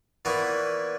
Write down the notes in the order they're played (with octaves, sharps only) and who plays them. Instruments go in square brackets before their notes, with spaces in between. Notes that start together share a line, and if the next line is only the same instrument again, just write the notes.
[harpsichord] A#2 E3 B3 F#4